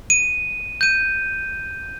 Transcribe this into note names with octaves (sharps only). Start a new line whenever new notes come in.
D#7
G6 D#7